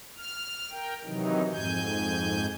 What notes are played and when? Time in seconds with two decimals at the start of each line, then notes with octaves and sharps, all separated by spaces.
0.17 F6
0.71 A#4 G5
1.04 C3 D#3 E3 F#3 D#4
1.53 F2 G#2 G#5 G6